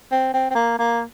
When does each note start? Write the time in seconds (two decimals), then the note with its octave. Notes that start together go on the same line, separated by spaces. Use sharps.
0.12 C4
0.34 C4
0.50 C4
0.55 A#3
0.79 A#3